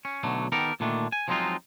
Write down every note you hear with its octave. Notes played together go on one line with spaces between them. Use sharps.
C#4
B1 B2 D3 F#3 A3
D#3 B3 G4 A4 A#4
A#2 D3 D#3 A3 D4
G#5
F3 F#3 G#3 C4 D#4 F4